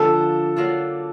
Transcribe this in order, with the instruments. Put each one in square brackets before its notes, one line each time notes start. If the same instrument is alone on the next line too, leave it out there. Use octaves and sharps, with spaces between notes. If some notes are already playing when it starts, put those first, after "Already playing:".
Already playing: [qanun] D3 F3 A#3 [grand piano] A4
[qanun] F#3 A#3 D4 F4